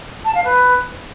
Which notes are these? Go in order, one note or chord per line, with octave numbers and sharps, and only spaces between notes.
A5
F5
B4